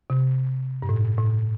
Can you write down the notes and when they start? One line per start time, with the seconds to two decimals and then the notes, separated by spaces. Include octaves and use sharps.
0.10 C3
0.82 G2
0.89 A2
1.19 A2